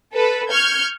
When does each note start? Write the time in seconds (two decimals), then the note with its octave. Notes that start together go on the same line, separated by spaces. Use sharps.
0.13 A4 B4
0.49 C#6 F6 G6 G#6